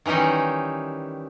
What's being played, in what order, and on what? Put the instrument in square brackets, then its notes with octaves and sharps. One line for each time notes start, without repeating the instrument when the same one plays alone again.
[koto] D#3 E3 G3 C#4 D#4